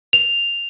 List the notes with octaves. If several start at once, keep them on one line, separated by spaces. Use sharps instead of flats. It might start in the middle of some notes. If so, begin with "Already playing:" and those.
F7